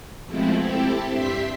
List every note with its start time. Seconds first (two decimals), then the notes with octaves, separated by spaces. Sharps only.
0.24 B2 F3 G#3 A3 C4 E4
0.57 C4 E4 G4 A4
1.06 G2 G4 E5 C6 B6